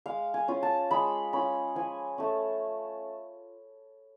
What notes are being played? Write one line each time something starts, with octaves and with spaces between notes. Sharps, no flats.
G#3 F5
G#5
C#4 F4
A5
G#3 B5
C#4 F4 B5
F3 G#5
A3 C#4